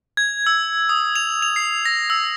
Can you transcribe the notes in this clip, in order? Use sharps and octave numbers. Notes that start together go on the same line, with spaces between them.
G#6
E6
D#6
F7
F7
C7
A#6
E6